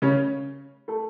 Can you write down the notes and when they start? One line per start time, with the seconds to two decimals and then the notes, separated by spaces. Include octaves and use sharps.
0.02 C#3 C#4
0.88 A3 A4